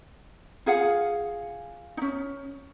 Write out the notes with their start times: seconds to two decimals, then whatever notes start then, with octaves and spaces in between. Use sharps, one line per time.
0.66 F4 G#4 F5 F#5
1.97 C#4 D#4